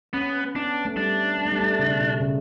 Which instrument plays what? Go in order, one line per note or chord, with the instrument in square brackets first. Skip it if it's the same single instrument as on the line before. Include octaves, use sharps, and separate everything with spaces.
[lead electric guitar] B3 [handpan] C#4
[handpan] B3 [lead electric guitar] D4
[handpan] A3
[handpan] G3 [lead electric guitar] D4
[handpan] B3
A3
G3
A3
C#3
B2
B2
C#3